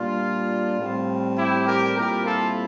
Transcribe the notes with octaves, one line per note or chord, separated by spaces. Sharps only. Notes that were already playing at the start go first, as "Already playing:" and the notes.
Already playing: A#2 G3 D4 F4
A2 G3 C4
E4 G4
G4 A#4
A#2 G3 C4 E4 G4 A#4
F4 A4